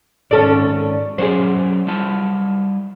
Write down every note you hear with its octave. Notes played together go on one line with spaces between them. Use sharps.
G#2 D#3 C#4 A4 D5
F#3 C#4 G#4 C5 D5
G3 E4 A5